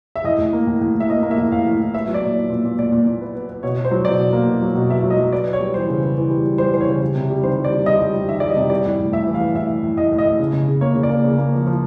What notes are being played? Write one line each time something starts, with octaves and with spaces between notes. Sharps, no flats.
E5
A2 D#5
A2
A#3
A2
A2
A2
E5
A#3 D#5
A#3
E5
A2
A2 F5
A2
A2
B3 E5
F#3
D5
A#2
B3
A#2
A#2
A#2 D5
A#2
A#2
B3
B3
B3
B2 C#5
B2
C5
F#3
B2 D5
B2
A#3
B2
F#3
B2
B2 E5
F#3
D#5
F#3
B3 D5
B3
C#5
G3
E3 C5
C#3
B3
E3
G3
G3
G3 C5
E3 C5
C#5
C#3
G3
C3
G3
D#3 C5
G3
D5
G3
G3 D#5
G3
G3
D#3 E5
G3 D5
D#5
C3
G3 D5
A2
A2
A2 E5
E3
F5
A2
A2 E5
A2
A2
A2 D#5
A2
D#5
A2
C#3
C#3
C#3
A#3 C#5
C#3
D5
A#3
C#3
A#3
F3
F3